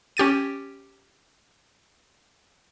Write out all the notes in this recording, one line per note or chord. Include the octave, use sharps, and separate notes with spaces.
C#4 G4 A6 D#7